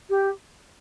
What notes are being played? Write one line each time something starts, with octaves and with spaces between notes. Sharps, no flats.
G4